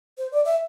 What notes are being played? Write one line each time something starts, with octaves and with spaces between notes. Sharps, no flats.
C5
D5
E5